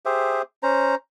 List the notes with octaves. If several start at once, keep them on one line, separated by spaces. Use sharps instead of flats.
G4 G#4 C5 E5
C#4 C5 A#5